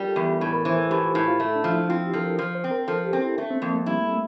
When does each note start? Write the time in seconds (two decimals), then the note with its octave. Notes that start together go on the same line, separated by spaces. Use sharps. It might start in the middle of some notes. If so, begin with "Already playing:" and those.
Already playing: G3 F4 G4 A#4
0.08 A4
0.16 E2
0.25 G4
0.40 A2 G4
0.53 A#4
0.65 E3 C5
0.78 A4
0.91 A2 G4
1.03 F4
1.15 A2 E4
1.28 F4
1.40 A3 E4
1.56 D4
1.64 F3
1.73 E4
1.89 C4 F4
2.06 G4
2.13 F3 A4
2.23 A#4
2.39 F3 C5
2.55 C5
2.64 C4
2.71 A#4
2.88 F3 A4
3.05 G4
3.13 C4
3.21 E4
3.38 A3 D4
3.51 C4
3.62 F2 A#3
3.74 A3
3.86 G3 E4
4.04 A3